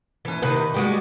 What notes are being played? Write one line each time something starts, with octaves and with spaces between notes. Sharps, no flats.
E3 C#4
C3 D#3 B4
G3 G#3 F#4